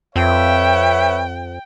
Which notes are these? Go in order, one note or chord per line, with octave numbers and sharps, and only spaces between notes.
F2 B4 C#5 E5 G5